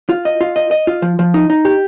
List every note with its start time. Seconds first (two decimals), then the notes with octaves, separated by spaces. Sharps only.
0.09 F4
0.25 D#5
0.41 F4
0.56 D#5
0.71 D#5
0.87 F4
1.02 F3
1.19 F3
1.34 D#4
1.50 D#4
1.65 G4